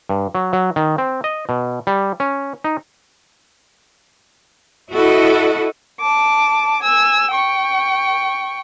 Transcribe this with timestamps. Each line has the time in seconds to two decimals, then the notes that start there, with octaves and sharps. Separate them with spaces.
0.09 G2
0.35 F#3
0.53 F#3
0.76 D#3
0.98 C4
1.24 D#5
1.49 B2
1.87 G3
2.20 C#4
2.64 D#4
4.92 E4 F#4 A4 D#5
6.00 A5 D6
6.83 G#5 E6
7.31 G5 C#6